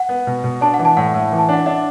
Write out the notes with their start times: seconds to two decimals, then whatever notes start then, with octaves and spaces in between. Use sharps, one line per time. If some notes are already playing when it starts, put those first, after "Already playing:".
Already playing: F#5
0.09 B3
0.27 B2
0.44 B2
0.61 D4 A5
0.74 F#5
0.79 E3
0.85 A5
0.97 A2 F#5
1.14 A2
1.32 E3
1.39 A5
1.49 D4 F#5
1.66 D4 E5